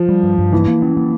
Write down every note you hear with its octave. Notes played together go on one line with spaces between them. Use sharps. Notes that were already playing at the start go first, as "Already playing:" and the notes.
Already playing: F3
G3
G2
G2
E3 A#3
A#3
C#4
A#3